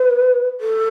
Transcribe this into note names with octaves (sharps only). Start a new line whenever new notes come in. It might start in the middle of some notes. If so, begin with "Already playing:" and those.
Already playing: B4
A4